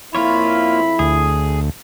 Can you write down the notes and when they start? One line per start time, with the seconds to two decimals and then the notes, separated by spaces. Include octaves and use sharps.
0.15 F2 A#3 E4 F4 C#5 B5
0.99 D2 G#4